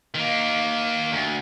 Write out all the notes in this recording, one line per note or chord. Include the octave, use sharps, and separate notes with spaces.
D#3 A#3
D2